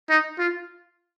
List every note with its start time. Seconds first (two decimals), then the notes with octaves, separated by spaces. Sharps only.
0.10 D#4
0.38 F4